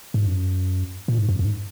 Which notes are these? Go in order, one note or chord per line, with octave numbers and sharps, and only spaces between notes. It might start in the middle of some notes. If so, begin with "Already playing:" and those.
G#2
F#2
A#2
G#2
F#2
F2
G#2